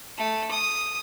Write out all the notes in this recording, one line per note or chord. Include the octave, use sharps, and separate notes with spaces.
A3
D#6